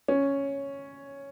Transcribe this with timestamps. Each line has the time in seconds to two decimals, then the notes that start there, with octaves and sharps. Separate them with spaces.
0.08 C#4